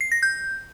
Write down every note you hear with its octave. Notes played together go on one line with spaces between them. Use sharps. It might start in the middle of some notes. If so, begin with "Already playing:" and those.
C7
A#6
G6